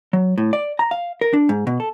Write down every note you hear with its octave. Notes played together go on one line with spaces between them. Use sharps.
F#3
A2
D5
A#5
F5
A#4
D4
G#2
B2
A4